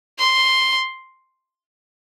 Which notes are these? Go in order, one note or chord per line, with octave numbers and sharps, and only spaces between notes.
C6